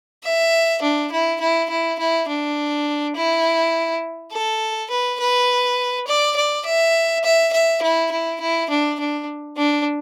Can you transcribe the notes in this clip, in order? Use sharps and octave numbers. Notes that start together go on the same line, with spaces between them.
E5
D4
E4
E4
E4
E4
D4
E4
A4
B4
B4
D5
D5
E5
E5
E5
E4
E4
E4
D4
D4
D4